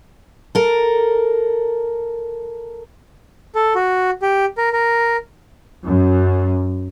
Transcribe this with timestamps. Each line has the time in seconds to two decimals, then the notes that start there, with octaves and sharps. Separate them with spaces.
0.55 A4 A#4
3.55 A4
3.75 F#4
4.22 G4
4.57 A#4
4.73 A#4
5.84 F#2